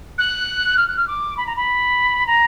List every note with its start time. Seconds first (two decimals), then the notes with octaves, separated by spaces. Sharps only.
0.18 F#6
0.77 F6
0.87 F#6
0.96 F6
1.07 D6
1.37 B5
1.46 A#5
1.56 B5
2.27 A#5